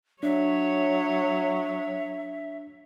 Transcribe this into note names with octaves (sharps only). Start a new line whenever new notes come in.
F#3 D4 C#5 E5